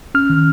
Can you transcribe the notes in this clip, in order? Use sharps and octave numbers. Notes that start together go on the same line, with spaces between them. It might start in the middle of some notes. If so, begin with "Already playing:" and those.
C#4 F6
D#3